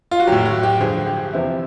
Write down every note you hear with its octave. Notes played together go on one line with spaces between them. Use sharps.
F4
F#4
A2 F#3 G4
F#4
G4
G2 D3 F3 G#4
G4
E2 C3 F3 E4